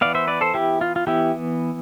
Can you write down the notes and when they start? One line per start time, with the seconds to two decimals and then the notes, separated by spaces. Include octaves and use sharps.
0.01 E3 B3 D5 F5
0.15 C5 E5
0.28 B4 D5
0.41 A4 C5
0.54 E4 G4
0.81 F4
0.96 F4
1.07 E3 B3 E4 G4